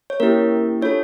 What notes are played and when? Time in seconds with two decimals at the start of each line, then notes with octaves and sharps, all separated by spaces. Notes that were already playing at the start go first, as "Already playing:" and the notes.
0.10 C#5
0.20 A#3 C#4 E4 G4 A#4
0.82 D4 F4 A4 C#5